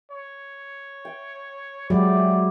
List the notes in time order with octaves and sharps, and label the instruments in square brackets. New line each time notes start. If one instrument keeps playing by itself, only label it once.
[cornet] C#5
[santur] G5
[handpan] F#3 G#3 G4 [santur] B3 E4 [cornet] D5